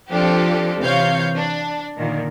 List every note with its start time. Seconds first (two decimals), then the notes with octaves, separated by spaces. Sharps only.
0.12 F3 C4 D4 F4 G4 A4
0.81 C3 E3 C#5 F5 G6
1.36 D4
1.97 A#2 D3 D#3